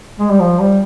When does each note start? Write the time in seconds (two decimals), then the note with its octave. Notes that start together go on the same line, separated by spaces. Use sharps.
0.20 G#3
0.30 G3
0.40 F3
0.59 G3